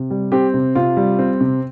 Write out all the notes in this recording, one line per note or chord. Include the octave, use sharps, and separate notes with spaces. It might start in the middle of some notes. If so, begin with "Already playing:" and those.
Already playing: C3
G3
C4 G4
C3
C3 F4
G3
C4
C3